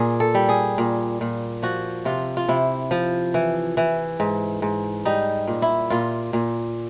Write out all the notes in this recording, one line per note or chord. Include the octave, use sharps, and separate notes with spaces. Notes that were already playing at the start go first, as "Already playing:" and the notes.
Already playing: A#2 G#4
A4
G3
G#4
A#2
A#2
F3 F#4
C3 F4
F4
C3 E4
F3
E3
E3
G#2
G#2
G3 D#4
A#2
E4
A#2 F4
A#2